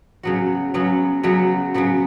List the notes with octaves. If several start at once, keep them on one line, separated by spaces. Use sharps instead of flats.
C#3 F#3 B3 F#4
C#3 F#3 B3 F#4
C#3 F#3 B3 F#4
C#3 F#3 B3 F#4